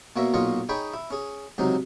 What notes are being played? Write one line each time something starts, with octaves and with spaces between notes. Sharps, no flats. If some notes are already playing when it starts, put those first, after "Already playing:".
B2 A#3 C#5 E5 A#5
B1 A#2 F4 C#5 D#5 C#6
D#4 G#4 C#5 G5 B5
E4
C#4 G#4
C#2 C3 F#3 D#4